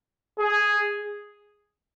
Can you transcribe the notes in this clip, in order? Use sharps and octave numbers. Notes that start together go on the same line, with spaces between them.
G#4